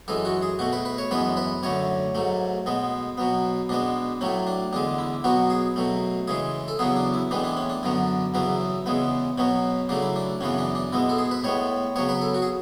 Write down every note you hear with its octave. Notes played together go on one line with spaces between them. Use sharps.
F#2 E3 G#3 A4
F#4
G#4
B2 A3 F#4
B4
B4
C#5
F#2 E3 G#3 B3 B4
B4
F#2 D3 A3 C#5
G#2 F#3 A3
B2 G#3 B3
B2 F#3 B3
B2 G#3 B3 D4
A2 F#3 A3 C#4
D4
E2 D3 G#3 D4
E4
B2 F#3 B3 F#4
G#4
B2 F#3 A3
C#3 E3 G#3 G#4
A4
E2 C#3 F#3 B3 G#4
D4
E4
A2 E3 G#3 B3 D4
D4
C#4
D4
F#2 D3 F#3 B3
E2 C#3 F#3 B3 E4
E2 C#3 G#3 B3
B2 F#3 B3 C#4
C#3 F#3 A3 D4
E4
D4
F#2 C#3 E3 B3 C#4
D4
D4
B2 G#3 B3 E4
A4
G#4
B4
A2 G#3 B3 C#5
C#3 F#3 B3 C#5
B4
A4
F#4
G#4